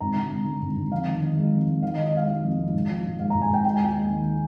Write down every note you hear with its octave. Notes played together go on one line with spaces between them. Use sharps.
G#1 A#5
D3
G#1
D3
G#1
G#1
F2 F5
D#3
D#3
G#3
F2
G#3
D#3 F5
D#5
D#3
D#5
G#3 F5
D#3 F5
F2
F1
G#2
F3
A#1
G#2 F5
A#5
G#2
G#5
G#2 G5
G#3 G5
G#5
D#2 G5
G#3
D#3